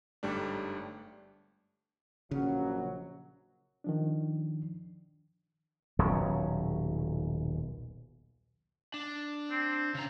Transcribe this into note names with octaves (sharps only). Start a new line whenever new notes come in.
G1 G#2 G3 A3 D4
A#1 C#3 F#3
D#3 F3 D4
D#1 B1 C#3 F#3
D4
C4
C#3 A#5